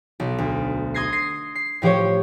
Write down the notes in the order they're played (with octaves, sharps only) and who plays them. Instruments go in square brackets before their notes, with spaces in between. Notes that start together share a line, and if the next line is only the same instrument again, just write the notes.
[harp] B1
D2
C6 D#6 G#6 A#6 C7
A#6 C7
C7
A2 F3 G4 C5 C#5